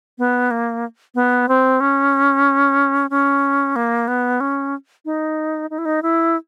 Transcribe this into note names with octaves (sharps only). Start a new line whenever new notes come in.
B3
A#3
B3
C4
C#4
C#4
A#3
B3
C#4
D#4
D#4
E4
D#4
E4